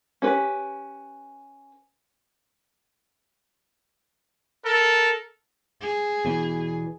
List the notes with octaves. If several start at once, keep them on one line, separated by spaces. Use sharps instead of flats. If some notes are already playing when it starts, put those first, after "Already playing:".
C#4 G4 B4
A4 A#4
G#4
E2 B2 E3